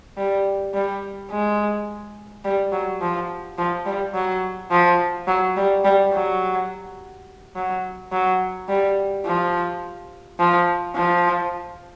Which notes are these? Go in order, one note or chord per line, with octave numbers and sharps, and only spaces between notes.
G3
G3
G#3
G3
F#3
F3
F3
G3
F#3
F3
F#3
G3
G3
F#3
F#3
F#3
G3
F3
F3
F3